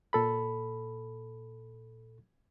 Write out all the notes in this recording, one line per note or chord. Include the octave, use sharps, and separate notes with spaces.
A#2 A4 B5